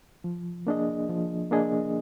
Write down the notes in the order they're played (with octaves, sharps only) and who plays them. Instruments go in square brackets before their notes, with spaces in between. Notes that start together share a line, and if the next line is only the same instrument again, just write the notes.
[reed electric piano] F3
A#3 D4 G#4 D#5
F3
A#3 D4 G#4 D#5